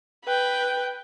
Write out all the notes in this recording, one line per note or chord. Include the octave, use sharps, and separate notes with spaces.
B4 G5